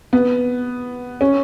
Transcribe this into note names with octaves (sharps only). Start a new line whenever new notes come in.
B3
C#4